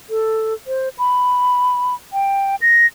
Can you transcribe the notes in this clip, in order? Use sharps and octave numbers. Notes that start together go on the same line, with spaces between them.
A4
C5
B5
G5
A#6